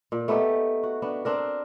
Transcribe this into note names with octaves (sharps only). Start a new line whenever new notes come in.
A#2
A3 B3 D#4 G4
F#4
B3 D4
C4 D4 A#4